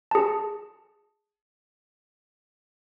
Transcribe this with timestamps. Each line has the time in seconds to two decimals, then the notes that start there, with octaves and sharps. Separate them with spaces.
0.11 G#4 A5